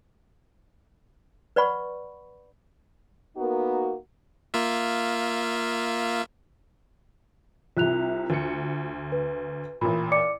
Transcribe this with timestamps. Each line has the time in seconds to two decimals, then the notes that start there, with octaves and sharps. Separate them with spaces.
1.56 B4 D5 F#5 B5 C#6
3.37 A#3 B3 D#4 F#4 A#4
4.54 A#3 F4 E5
7.77 C2 C3 F4 F#6 F7
8.30 D2 C#7
9.12 B4
9.81 A1 A#2 B5
10.12 D5 D6 C#7